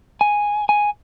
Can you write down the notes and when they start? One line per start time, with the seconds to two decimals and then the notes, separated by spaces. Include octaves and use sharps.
0.21 G#5
0.69 G#5